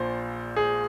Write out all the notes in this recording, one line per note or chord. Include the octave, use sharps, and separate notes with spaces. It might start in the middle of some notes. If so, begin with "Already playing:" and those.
Already playing: A#1 A#2 C5
G#4